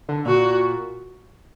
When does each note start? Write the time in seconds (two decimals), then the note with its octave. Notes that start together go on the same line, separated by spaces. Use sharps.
0.09 D3
0.25 A#2 F#4